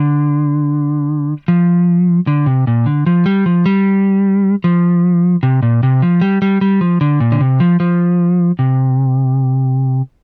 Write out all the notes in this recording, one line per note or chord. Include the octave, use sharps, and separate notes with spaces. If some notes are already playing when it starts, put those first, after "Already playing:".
Already playing: D3
F3
D3
C3
A#2
D3
F3
G3
F3
G3
F3
C3
A#2
C3
F3
G3
G3
G3
F3
D3
A#2
D3
C3
F3
F3
C3